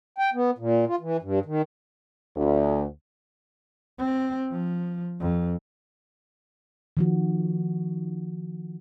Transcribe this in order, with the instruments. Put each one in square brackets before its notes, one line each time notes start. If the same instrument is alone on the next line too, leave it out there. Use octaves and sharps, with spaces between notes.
[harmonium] G5
B3
A#2
F4
E3
G2
D#3
[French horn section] D2
[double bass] C4
F3
F2
[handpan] D#3 F3 F#4